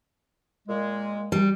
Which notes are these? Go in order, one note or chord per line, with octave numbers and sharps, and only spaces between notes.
A#2 G#3
G3